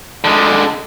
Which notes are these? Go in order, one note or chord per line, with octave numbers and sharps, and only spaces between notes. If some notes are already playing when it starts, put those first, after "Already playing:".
D3 G#3